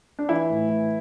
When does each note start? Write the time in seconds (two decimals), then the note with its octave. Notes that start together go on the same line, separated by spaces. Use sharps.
0.19 D4
0.29 E3 E4
0.50 A2
0.69 E3